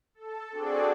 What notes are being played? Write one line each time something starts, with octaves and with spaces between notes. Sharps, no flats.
A4
C4 D4 F#4 G#4 A4 D5